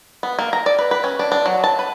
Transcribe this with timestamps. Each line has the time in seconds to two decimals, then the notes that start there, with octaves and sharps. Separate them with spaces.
0.23 B3
0.39 A#3
0.53 A#5
0.66 D5
0.79 B4
0.91 B4
1.04 C#4
1.19 D4
1.32 D4
1.46 F#3
1.64 A5
1.79 B4